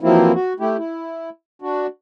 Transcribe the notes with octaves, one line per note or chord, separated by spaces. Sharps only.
E2 F3 F#3 A#3 C4 E4
F#4
A3 E4 G4
E4
D4 F#4